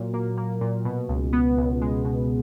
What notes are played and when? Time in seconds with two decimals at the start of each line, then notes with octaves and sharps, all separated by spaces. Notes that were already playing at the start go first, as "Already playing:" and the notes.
Already playing: A#2 F#3 A#3
0.14 A#3
0.37 A#3
0.61 A#2
0.85 B2
1.09 C#2
1.33 B3
1.57 C#2
1.81 G#3
2.05 B2